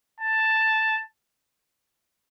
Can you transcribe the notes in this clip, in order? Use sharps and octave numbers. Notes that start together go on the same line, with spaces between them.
A5